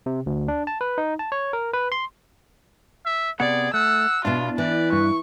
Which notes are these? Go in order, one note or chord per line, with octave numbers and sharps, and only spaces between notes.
C3
D2
D4
A5
B4
D#4
A5
C#5
A#4
B4
C6
E5
C3 B3 G#4 D5 F#5
A3 F#5 E6
B2 D4 E4 F4 F5
E3 B4 D5
G2 C#6